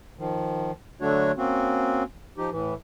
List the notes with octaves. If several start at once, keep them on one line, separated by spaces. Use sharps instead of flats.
D#3 F3
D3 F#3 A3 D4 F#4 C#5
A#3 C4 C#4 F#4
F3 D#4 G4
A2 E3